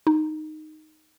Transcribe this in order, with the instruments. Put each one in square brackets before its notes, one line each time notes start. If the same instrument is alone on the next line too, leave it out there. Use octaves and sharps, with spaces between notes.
[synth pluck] D#4